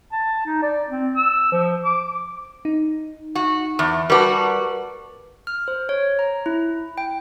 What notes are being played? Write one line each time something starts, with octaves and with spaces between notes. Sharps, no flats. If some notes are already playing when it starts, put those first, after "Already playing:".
A5
D#4
D5
C4
E6
F3
D6
D#4
F#4
E2
G3 F#4 A#4 B4 A5
F6
C5
C#5
A#5
E4
G5